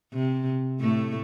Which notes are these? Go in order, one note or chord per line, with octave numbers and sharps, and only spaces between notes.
C3
A2 A3